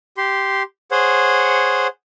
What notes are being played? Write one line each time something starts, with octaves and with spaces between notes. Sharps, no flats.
G4 C6
G#4 C5 C#5 F#5